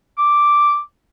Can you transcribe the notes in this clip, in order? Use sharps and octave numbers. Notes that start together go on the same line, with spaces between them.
D6